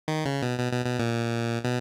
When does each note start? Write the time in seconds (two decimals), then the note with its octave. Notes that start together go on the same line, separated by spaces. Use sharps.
0.08 D#3
0.25 C#3
0.42 B2
0.59 B2
0.72 B2
0.86 B2
0.99 A#2
1.64 B2